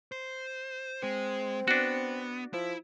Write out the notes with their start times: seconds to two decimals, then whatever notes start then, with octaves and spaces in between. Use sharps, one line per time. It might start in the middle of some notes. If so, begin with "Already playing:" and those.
0.12 C5
1.03 G#3 C4
1.68 B3 D4 F#4
2.53 F3 E4